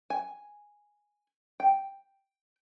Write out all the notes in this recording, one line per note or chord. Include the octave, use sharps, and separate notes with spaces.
G#5
G5